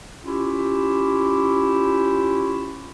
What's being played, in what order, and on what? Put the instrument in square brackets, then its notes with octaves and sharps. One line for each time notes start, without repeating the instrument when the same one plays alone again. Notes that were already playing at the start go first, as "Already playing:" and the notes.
[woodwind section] C#4 E4 F4 G4